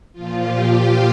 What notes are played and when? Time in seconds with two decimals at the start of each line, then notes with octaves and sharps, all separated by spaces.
0.13 A#2 F3 F4
0.42 G4
0.71 F5